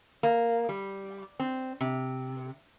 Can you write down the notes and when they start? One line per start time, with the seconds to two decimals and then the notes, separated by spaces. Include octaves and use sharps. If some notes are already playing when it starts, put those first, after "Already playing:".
0.23 A#3
0.69 G3
1.39 C4
1.80 C3